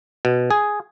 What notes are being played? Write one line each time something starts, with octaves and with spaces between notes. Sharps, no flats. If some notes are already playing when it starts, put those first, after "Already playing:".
B2
G#4